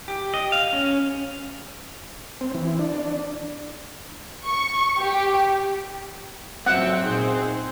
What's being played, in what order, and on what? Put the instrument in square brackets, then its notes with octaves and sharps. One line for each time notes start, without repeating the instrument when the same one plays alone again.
[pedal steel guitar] G4
D#5
F5
C#4
[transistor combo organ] C4
E3
D4
[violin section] C#6
G4
[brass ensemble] F#1 F2 E5 [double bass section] G#2 F#3 C#4 [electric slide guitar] C4 [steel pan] F#5
[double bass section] A#2 [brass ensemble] D#4 G#4 C5